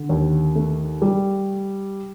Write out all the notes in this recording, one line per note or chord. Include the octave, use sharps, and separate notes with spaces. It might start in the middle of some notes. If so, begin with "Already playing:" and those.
Already playing: D3
D#2
A3
G3